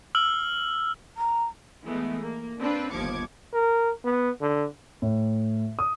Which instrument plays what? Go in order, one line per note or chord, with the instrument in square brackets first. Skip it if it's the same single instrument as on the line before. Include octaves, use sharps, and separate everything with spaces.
[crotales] E6 F6 F#7
[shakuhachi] A#5
[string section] E3 G#3 A3 B3
A#3
C4 D4 F4 B4
G1 D#2 F3 D6 G#6 C#7
[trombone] A#4
B3
D3
[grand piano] A2
D#6